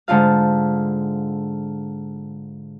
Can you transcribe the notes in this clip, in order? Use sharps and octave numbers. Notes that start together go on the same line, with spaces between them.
G#2 D3 F4 F5